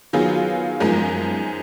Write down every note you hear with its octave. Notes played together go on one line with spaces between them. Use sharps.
D#3 F#3 B3 F4 G#4
F#2 F3 G#3 D#4 A#4